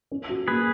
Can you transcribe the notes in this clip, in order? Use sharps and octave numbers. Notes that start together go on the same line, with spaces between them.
C#4
F#4
A#3 G#4 B4